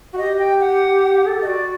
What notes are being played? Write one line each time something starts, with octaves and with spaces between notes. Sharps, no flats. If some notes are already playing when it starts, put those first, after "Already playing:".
F#4 F#5
G4 D#5
G5
F#5
A4
G4 D#5
F#4 D5